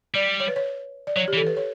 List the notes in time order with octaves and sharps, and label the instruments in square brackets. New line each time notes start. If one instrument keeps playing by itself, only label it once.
[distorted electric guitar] G3 [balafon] D5
[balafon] C#5
B4
C#5
D5
[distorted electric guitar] F#3 [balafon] C#5
[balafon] G4
[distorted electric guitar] E3
[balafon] A4
B4
C#5